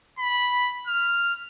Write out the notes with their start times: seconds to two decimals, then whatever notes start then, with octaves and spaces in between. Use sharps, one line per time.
0.19 B5
0.87 F6